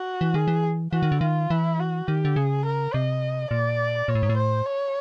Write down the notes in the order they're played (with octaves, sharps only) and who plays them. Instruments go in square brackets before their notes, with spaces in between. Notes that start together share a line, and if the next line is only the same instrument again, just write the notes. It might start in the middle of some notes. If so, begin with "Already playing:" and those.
Already playing: [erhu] F#4
[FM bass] E3
[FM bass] D#3 [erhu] G#4
[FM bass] E3
[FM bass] E3 [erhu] F#4
[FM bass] D#3
D3
[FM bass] D#3 [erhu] F4
[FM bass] E3 [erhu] E4
[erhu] F#4
[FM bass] D#3 [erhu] G4
[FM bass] D3
[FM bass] C#3 [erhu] G#4
[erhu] A#4
[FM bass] C3 [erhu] D#5
[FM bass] A#2 [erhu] D5
[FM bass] A#2 [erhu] C#5
[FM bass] A2
G#2
A2
[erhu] C5
C#5